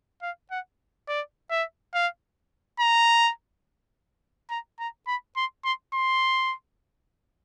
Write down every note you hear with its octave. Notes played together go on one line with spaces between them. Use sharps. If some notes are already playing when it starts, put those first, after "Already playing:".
F5
F#5
D5
E5
F5
A#5
A#5
A#5
B5
C6
C6
C6